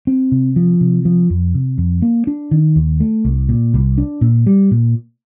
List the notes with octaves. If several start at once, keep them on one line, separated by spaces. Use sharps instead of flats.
C4
C3
F3
C3
F3
F2
C3
F2
A#3
D4
D#3
D#2
A3
C2
A#2
C2
D4
A#2
G3
A#2